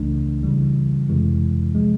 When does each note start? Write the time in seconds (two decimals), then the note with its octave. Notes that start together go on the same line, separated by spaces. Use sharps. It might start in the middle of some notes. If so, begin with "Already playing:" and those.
Already playing: C#2 C#3 E3 A3 D4
0.43 C#3 E3 G3
1.09 F2 C3 E3 G#3
1.75 C3 F3 G#3